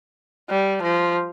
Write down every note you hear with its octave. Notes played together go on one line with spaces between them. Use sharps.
G3
F3